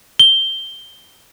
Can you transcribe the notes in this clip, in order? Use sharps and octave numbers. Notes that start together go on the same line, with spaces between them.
G7